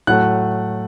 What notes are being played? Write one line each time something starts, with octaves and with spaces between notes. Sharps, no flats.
A2 F#3 A3 F#5 F#6